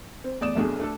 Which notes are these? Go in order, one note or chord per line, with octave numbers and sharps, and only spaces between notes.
C4
E2 A2 D5 D#6 E7
F1 B1 A3 D4 G#4
A3 D4 A4